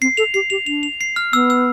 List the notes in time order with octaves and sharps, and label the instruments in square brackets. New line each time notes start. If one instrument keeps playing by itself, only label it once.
[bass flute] C4 [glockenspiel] C7
[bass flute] A4 [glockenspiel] F7
[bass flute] G4 [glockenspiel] C7
[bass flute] G4 [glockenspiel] F7
[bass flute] D4 [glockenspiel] F7
[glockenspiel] F7
C7
F6
[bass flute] B3 [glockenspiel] E6
[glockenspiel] E6